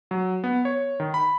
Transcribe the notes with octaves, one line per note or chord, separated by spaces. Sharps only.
F#3
B3
C#5
D#3
B5